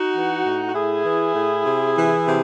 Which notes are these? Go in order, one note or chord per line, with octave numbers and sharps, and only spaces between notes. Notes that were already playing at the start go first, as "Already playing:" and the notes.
Already playing: D#4 F#4
E3
A2
F#4
A2 E4 G#4
E3
A2
C3
E3
C3